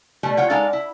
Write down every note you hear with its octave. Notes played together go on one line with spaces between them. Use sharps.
B2 G3 A3
F4 C#5 F#5 G5
G#3 D#4 A4 D5 F5 F#5
E4